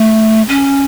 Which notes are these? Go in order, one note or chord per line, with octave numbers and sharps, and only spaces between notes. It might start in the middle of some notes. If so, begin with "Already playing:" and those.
Already playing: A3
C#4